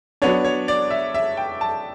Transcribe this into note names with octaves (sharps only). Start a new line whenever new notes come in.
F#3 B3 D4 C#5
C#5
D5
E5
E5
G5
A5